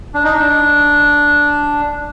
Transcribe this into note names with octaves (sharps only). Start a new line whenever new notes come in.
D4
D#4
D4